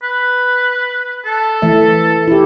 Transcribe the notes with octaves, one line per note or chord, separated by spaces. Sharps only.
B4
A4
E3 A3 E5
E4 G4